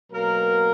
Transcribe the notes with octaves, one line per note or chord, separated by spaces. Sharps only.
B2 F#3 A#3 A#4